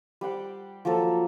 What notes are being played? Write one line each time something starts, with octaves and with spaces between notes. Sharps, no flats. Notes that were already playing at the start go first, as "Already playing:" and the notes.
G3 C5 F#5 D6
F3 F#3 A#3 A4